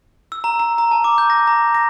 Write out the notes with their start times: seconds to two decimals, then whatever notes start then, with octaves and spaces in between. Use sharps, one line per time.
0.32 E6
0.44 A#5
0.59 A#5
0.78 A#5
0.91 A5
1.04 D6
1.18 G6
1.30 A#6
1.47 A#5
1.75 A#6